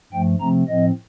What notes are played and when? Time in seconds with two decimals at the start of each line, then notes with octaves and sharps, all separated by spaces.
0.12 G2 F3 A3 G5
0.40 C3 F3 A3 C4 A#5
0.68 A2 F3 C4 D#5